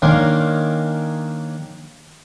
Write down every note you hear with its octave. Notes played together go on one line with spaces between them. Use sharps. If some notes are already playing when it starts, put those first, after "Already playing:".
D#3 A#3 C#4 D4 A#5 C6